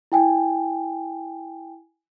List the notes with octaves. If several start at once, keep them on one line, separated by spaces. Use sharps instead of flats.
E4 G5 G#5